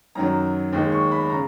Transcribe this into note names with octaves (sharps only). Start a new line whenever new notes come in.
F#2 D#3 F#3 A#5
D#2 D#3 G#3
C#6
B5
C#3 A#5